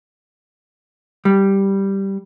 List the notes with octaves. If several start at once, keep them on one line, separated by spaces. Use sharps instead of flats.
G3